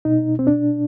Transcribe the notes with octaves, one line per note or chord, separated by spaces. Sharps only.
B2 D#4
C4
D4